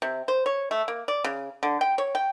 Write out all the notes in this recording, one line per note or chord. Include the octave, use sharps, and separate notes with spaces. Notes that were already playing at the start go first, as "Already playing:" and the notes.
C3
C5
C#5
A3
A#3
D5
C#3
D3
G5
C#5
G5